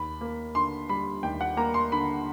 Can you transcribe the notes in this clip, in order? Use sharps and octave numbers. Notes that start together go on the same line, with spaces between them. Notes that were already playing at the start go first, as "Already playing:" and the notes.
Already playing: D#2 B5
A#3
D3 C6
G3 B5
D#2 G5
F#5
A#3 A#5
C6
D3 B5